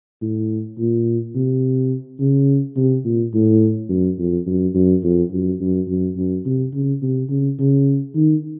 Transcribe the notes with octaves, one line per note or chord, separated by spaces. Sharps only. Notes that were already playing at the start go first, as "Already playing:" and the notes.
A2
A#2
C3
C#3
C3
A#2
A2
F#2
F2
F#2
F#2
F2
F#2
F#2
F#2
F#2
C3
C#3
C3
C#3
C#3
D#3